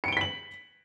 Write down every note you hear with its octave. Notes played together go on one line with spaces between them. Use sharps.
B6 C#7 D7 F#7 G7